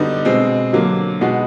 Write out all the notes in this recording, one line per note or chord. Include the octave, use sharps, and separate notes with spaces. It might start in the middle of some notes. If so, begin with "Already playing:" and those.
Already playing: D3 G3 B3 D#4 F#4
B2 G#3 C4
D3 F#3 A#3
B2 G#3 B3 D#4 F#4